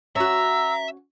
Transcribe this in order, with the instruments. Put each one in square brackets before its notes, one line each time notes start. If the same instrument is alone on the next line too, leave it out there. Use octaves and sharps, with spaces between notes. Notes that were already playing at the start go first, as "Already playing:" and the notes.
[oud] C#4 F#4 [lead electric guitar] E5 [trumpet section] A#5 [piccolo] E6